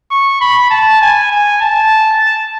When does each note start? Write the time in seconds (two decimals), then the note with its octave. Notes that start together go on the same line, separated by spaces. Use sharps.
0.11 C#6
0.41 B5
0.71 A5
1.01 G#5
1.31 G#5
1.61 A5